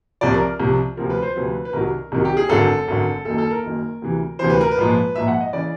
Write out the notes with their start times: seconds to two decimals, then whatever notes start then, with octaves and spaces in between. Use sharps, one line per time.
0.21 C2 C3 F3 D5
0.34 A#4
0.60 C2 C3 F3
0.97 D2 C3 F3 A#4
1.10 B4
1.22 C5
1.35 D2 C3 F3 B4
1.65 B4
1.73 C2 C3 D#3 F#3 A#4
2.12 C2 C3 D#3 F#3
2.25 G4
2.37 G#4
2.49 G#1 F#2 D3 A4
2.88 G#1 F#2 D3
3.25 F#1 F#2 D#3 A4
3.38 A4
3.51 A#4
3.63 F#1 F#2 D#3
4.02 D2 C3 E3
4.39 D2 C3 E3 C5
4.50 B4
4.61 A#4
4.71 B4
4.77 A#1 G#2 F3
5.15 A#1 G#2 F3 E5
5.28 F#5
5.40 D#5
5.53 C#3 E3 D5